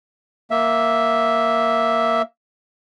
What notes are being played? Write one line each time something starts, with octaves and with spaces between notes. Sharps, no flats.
A#3 E5